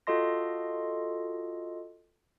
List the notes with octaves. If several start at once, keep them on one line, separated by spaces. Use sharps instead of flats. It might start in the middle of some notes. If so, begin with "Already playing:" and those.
F4 F#4 A4 D#5 C6 A#6